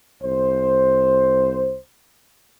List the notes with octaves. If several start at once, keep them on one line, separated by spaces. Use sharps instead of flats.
C2 C5